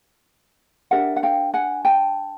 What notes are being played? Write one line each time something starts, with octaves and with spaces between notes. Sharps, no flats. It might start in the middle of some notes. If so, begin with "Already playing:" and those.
D4 G4 A#4 E5 F#5
F#5
F5 G5
F#5 G#5
G5 A5